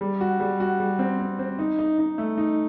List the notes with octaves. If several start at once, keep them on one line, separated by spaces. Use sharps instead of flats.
G3
F#4
G3
F#4
G3
C4
C4
C4
D#4
D#4
D#4
A3
D#4